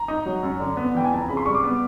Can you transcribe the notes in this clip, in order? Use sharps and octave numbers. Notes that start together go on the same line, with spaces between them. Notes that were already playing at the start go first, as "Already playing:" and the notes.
Already playing: A#5
D#4
F#3
F#2
D3
B3
E3 G5
G#5
F2 A5
A#5
C#3 B5
C6
G3 C#6
D6
B3